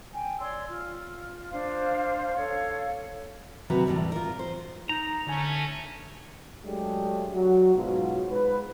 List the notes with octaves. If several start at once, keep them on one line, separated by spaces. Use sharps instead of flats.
G5 G#5
C#5 D5 C6 E6
F4
D4 C5 F5
A4 C#5 F5
D#2 C3 F#3 F#4 B4 A#5
E2 A2 C#3 G3
F4 A#4
C5
D#4 A#5
D3 A3 C#4 G#5
F#3 G#3 A3 D4 G4
F#3 F#4
G#2 B2 F#3 F4 F#4
G#2 B4